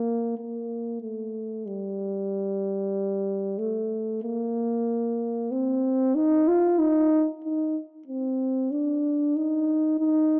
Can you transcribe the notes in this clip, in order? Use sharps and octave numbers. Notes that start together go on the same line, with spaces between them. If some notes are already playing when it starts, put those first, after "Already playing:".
Already playing: A#3
A#3
A3
G3
A3
A#3
C4
D#4
F4
D#4
D#4
C4
D4
D#4
D#4